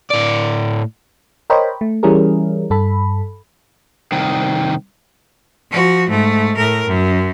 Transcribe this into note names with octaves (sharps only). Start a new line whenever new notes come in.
A2 D5
A#4 C5 C#5 D#5 G5 B5
A3
E3 G3 C#4 E4 G#4 A#4
G2 A4 B5
C2 D#3
F3 F#4
G#2 A3
A2 A#4
F#2